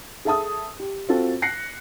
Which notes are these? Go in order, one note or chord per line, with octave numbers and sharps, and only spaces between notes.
G#4 A4 E5 A5 D#6
G4
C4 F4 F#4 A4
F#6 A#6 C7 C#7